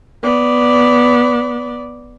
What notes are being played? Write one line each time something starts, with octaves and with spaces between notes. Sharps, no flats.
B3 D5